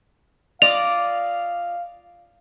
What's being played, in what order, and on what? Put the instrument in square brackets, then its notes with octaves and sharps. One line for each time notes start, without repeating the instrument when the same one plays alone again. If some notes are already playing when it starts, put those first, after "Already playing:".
[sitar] F4 D5 D#5 [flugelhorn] F5 [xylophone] F7